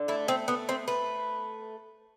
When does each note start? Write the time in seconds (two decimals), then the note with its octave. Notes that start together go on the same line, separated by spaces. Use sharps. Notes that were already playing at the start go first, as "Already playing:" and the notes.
Already playing: D3
0.08 A3 E4
0.28 C4
0.48 A3 B3
0.69 C4
0.88 A3 B4